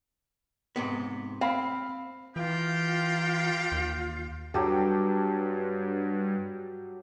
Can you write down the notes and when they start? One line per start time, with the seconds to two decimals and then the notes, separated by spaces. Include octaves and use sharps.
0.76 G#2 C3 B3
1.41 C4 F5 B5
2.36 E3 F4 G4 A#4 G5
3.72 D#2
4.54 G2 F#3 G4 A4